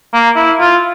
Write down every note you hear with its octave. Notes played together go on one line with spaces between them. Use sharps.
A#3
E4
F4